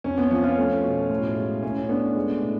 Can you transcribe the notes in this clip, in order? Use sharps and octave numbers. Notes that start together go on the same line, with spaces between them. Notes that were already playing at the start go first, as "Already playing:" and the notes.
F2 C#4
B3
F3 C#4
C#4 F4
A3
B2
A2
G#3
A2 C#4
A3 B3 D4
G#3
A2